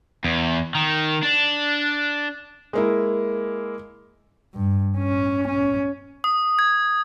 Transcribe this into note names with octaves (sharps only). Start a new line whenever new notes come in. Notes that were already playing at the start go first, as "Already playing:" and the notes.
E2
D#3
D4
G#3 A#3 E4
G2
C#4
C#4
D#6
G#6